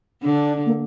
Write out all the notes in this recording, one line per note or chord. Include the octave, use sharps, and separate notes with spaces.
D3 D4
A#3